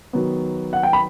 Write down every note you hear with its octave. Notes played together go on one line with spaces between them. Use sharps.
D#3 F#3 B3
F#5
G5
B5